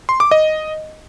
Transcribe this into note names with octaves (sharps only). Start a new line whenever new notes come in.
C6
D6
D#5